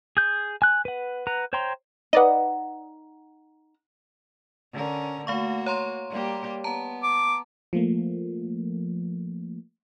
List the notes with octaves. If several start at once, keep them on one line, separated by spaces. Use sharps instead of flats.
G#4 G6
G#5 F#6
B4 F#5
B4 F#5 A#5
C5 C#5 G5 A#5 C6
D#4 B4 D5 D#5 F#5
D3 C#4 A#4
A3 A#3 F#4 F5 C#6
C#5 A#5 C6
G3 A#3 G4
B3 A5 A#5
D6
F3 A3 A#3